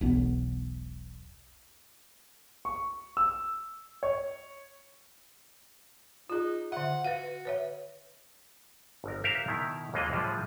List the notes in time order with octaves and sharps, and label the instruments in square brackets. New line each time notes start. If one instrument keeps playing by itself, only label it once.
[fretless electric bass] E1 B1 B3
[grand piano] C#6
E6
C#5
[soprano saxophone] D#4 [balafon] F4 G#4
[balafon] D3 E5 [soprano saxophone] F#5
[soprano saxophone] F#4 [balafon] B4 F5
[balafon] B4 C#5 E5
[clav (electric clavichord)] G1 A#4
F#4 G4 A#4 E5 F5
B2 D#3 E4
D#2 E3 G#3 A#3 F4 D#5
A2 D3 F3 G3 G#3